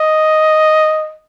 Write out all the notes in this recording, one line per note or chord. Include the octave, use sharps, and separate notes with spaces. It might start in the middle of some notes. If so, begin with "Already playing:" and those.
Already playing: D#5